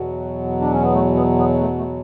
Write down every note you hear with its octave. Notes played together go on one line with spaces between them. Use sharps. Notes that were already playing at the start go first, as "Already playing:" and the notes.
Already playing: E2 B2 F#3
D4
C#4
B3
A3
B3
B3
A3
A3